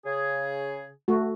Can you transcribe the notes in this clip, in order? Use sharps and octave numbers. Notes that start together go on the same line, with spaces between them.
C#3 G#4
A3 F#4